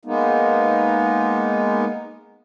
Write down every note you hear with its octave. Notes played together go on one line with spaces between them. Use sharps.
G#3 A#3 B3 D#4